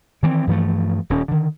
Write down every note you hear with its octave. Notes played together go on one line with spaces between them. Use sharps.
D#3 E3 G3 C4
G2 E3 F3 A3
D#1 C#4
D3 D#3